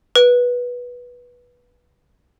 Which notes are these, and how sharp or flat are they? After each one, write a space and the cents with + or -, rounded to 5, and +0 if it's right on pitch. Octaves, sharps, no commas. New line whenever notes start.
B4 -15